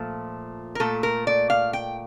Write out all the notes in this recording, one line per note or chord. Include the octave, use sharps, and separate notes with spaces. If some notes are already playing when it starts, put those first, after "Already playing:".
Already playing: A#2 F3 A3
A#4
A#2 A3 A4
A#4
D5
F5
G5